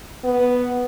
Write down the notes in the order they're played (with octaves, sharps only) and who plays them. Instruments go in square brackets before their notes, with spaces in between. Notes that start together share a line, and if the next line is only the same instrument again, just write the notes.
[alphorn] B3